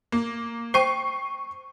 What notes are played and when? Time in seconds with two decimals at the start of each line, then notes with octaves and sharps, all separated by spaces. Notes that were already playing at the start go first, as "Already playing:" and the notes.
0.12 A#3
0.74 C5 G5 C#6 C7